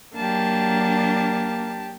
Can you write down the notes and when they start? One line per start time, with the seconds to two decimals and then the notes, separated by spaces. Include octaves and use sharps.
0.16 F#3 A#3 D4 G4 A5